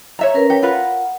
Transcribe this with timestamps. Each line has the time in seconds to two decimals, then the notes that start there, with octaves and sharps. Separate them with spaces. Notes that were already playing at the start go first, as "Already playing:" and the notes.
0.19 C#5 E5 A#5
0.34 C#4 A#4 B4
0.50 G4 C#5
0.63 F4 A#4 B4 F#5